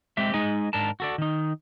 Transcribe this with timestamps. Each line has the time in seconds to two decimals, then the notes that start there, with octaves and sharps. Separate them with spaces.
0.17 G#3 C4 G4 E5
0.34 G#3 D#4 G#4 D#5 G#5
0.73 G#2 D4 A#4 A5
1.00 F#4 A4 D5
1.18 D#3 D#4